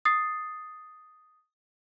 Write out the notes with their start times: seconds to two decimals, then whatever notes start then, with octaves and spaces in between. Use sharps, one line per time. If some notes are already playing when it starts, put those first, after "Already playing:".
0.05 D#6 A6 C7